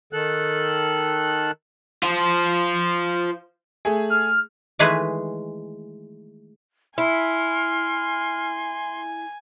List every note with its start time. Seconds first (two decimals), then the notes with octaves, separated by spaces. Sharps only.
0.13 D#3 A4 F#6
2.03 F4 C5
3.85 A3 G#4
4.10 F6
4.79 D#3 E3 G#3 A3 G#4 B4
6.98 E4 G#5 C6 F6